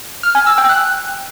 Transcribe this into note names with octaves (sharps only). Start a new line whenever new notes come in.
F6
G#5
E6
G5
F#6